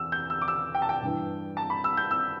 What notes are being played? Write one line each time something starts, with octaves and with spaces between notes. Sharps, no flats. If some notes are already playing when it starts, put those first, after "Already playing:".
Already playing: E2 E6
G6
E6
D6
E6
G5
A5
G5
G2 E3
A5
B5
E6
G6
E6